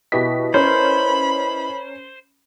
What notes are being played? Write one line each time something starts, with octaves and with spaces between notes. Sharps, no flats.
B2 E4 G4 B4 D#5 B6
C#4 A#4 C5 B5